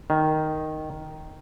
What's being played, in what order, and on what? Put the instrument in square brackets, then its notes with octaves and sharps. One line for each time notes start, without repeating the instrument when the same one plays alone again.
[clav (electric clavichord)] D#3